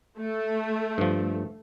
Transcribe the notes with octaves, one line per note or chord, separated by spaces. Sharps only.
A3
G2 F3